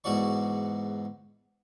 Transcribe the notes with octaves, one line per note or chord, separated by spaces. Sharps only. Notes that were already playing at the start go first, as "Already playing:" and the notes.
E2 G#2 F#4 D5 C#6